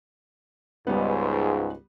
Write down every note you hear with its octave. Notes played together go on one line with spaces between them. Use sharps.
C#2 G#2 G3 B3